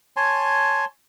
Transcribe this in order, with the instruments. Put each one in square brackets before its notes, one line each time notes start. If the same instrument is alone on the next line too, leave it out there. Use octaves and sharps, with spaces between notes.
[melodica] C#5 G#5 A5 C6